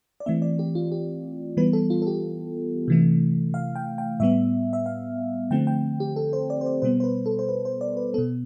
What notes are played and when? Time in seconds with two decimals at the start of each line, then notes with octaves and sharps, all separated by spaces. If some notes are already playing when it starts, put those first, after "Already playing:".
0.20 D5
0.26 E3 A3 C4 E5
0.42 D5
0.59 G4
0.75 F4
0.92 G4
1.57 E3 G3 B3 B4
1.73 A4
1.90 F4
2.02 A4
2.07 G4
2.88 C3 E3 A3
3.54 F5
3.76 G5
3.98 G5
4.20 A2 G3 B3 E5
4.73 E5
4.86 F5
5.51 D3 F3 A3 C4 G5
5.67 G5
6.00 G4
6.16 A4
6.33 C5
6.50 D5
6.61 C5
6.66 D5
6.82 B2 G3 B3 C5
7.00 C5
7.04 B4
7.26 A4
7.39 C5
7.49 B4
7.65 C5
7.81 D5
7.97 B4
8.14 B2 B3 A4